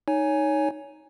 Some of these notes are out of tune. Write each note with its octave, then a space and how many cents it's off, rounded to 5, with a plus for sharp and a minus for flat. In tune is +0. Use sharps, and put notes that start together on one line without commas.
D#4 -5 C#5 +15 G#5 +0